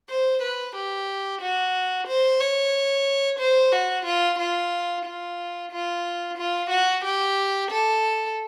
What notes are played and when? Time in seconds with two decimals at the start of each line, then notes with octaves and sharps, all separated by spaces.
0.09 C5
0.42 B4
0.76 G4
1.41 F#4
2.07 C5
2.40 C#5
3.39 C5
3.72 F#4
4.06 F4
4.39 F4
5.06 F4
5.71 F4
6.38 F4
6.70 F#4
7.04 G4
7.70 A4